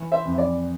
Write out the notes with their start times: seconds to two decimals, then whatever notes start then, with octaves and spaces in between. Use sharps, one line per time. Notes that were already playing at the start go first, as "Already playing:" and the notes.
Already playing: E3
0.11 C5 E5
0.25 F2
0.38 D5